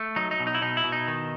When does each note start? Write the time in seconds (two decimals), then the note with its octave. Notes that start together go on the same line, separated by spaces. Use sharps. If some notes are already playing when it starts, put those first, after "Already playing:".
Already playing: A3
0.16 F#3 D#4
0.31 D#4
0.40 B2
0.47 D#4
0.55 E4
0.62 B2 D#4
0.77 E4
0.84 B2
0.92 D#4
1.08 D#3